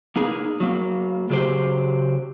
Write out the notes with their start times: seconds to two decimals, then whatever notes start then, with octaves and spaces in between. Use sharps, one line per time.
0.16 A#3 D#4 G#4
0.60 F#3 A#3
1.30 C#3 F#3 G4 C5